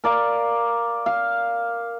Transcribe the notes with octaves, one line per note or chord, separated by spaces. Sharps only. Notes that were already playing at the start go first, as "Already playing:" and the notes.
A#4 D5 F5
F5